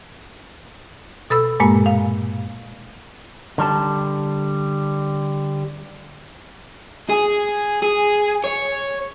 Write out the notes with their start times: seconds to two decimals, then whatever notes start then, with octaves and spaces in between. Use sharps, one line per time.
1.30 B2 A4 B5 E6
1.60 G2 A#2 G#3 A#3 G#5
1.86 F5
3.58 D3 G3 A5
7.10 G#4
7.83 G#4
8.44 C#5